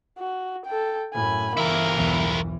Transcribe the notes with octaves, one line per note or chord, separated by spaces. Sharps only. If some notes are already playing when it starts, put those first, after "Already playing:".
F#4
A4 G5
F#2 A2 G#5 B5
G1 E3 A#3 E4 A#4
B1 E2